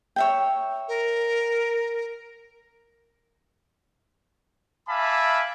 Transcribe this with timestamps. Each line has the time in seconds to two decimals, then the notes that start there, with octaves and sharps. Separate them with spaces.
0.16 C#5 E5 G5
0.88 A#4
4.89 E5 F5 G#5 A5 B5 D6